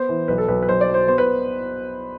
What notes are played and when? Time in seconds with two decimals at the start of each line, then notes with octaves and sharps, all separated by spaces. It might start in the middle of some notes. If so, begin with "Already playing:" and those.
Already playing: B3 C5
0.09 E3
0.28 B1 B4
0.38 A4
0.48 B1 B4
0.63 B4
0.68 B1 C5
0.81 D5
0.87 F#3
0.94 C5
1.08 B3 C5
1.18 B4